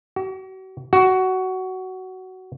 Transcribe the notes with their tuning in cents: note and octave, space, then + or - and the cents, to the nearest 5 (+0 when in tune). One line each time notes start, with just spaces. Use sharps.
F#4 +40
F#4 +15